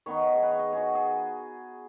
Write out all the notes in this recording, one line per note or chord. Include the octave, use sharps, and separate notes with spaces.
D#3 B3 D#4 C#5
G#4
B4
C#5
D#5
F#4 G#4
G#4